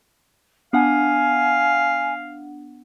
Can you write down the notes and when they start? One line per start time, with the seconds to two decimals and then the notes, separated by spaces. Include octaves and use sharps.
0.73 B3 D4 F5 F#5 G#5